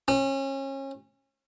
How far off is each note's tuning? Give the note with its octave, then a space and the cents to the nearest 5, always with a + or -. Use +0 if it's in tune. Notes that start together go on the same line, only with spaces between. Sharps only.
C#4 -30